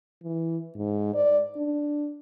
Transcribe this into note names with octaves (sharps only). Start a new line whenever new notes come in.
E3
G#2
D5
D4